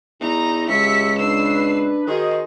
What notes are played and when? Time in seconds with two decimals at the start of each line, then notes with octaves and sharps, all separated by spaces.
0.20 E2 D#4 A#5
0.69 C#2 G4 E5 B6 C#7
1.18 D4 B4 E6 C7
2.07 D#3 F#4 G#4 C5 D#5